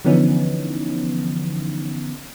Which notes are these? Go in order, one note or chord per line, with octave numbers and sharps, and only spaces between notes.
D3 E3 F3 B3 C#4 D#4